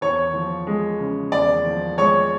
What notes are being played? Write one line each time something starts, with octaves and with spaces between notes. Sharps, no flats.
E2 C#5 C#6
F3
G#3
C#3
E2 D5 D6
F3
G#3 C#5 C#6